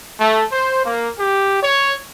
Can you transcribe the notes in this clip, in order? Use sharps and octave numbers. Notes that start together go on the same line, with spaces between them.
A3
C5
A#3
G4
C#5